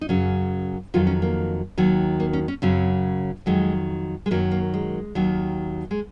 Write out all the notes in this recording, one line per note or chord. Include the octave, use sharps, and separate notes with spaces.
D#4
F#2 C#3 F#3 C#4
F2 D#3 F#3 F4
C#4
A#3
D#2 D#3 F#3
A#3
C#4
C#4
F#2 C#3 F#3 C4
F2 D#3 F#3 G#3
G#3
F#2 D#3 F#3 A#3
A#3
G#3
D#2 D#3 F#3
G#3